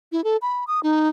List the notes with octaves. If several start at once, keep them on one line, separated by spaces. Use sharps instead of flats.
E4
A4
B5
D#6
D#4